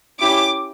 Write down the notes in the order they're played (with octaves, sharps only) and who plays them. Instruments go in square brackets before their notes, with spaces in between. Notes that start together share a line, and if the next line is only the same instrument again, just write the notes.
[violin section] C#4 E4 G4 D6